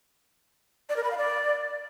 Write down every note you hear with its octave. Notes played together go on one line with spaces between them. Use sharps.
D5
A#4
B5
F5
D5